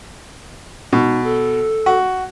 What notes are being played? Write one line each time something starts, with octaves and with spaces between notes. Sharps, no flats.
B2 D#4
A4
F#4